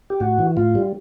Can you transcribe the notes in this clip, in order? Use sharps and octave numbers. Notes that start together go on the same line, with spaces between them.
G4
A2 F#4
E3
A2 F4
G3